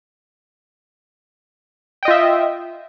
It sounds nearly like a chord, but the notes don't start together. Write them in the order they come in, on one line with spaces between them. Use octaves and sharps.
G5 D#5 F4 E5